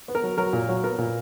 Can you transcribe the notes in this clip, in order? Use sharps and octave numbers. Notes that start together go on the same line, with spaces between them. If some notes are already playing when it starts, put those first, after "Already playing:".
B3
A#4
F#3
F#3 A#4
A#2
F#3
B3 A#4
A#2